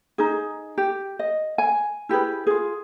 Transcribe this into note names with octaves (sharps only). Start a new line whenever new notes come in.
D#4 G#4
G4
D#5
G#5
E4 G4 G#4 B4
F4 G#4